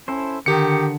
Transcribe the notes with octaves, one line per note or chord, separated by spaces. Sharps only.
C#4 E4 A4 C5
D3 D#3 G4 C#7